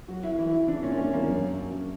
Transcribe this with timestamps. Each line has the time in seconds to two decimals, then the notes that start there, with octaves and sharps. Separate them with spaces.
0.08 F#3 F#4
0.23 E4
0.38 E3 E4
0.53 E4
0.67 C#3 D4
0.83 A#2 C#4
0.92 D4
0.97 G2 C#4
1.12 E2 A#3
1.27 F#2